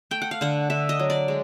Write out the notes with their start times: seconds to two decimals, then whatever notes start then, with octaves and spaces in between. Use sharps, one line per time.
0.11 A3 G5
0.22 F#5
0.31 F5
0.41 D3 F#5
0.70 D3 E5
0.89 D#5
0.99 F#3
1.10 D5
1.28 G#3